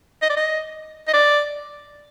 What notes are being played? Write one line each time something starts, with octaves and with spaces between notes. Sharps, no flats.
D#5
D5
D#5
D#5
D5